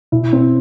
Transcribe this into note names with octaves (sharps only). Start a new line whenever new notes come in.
B2 E4
C4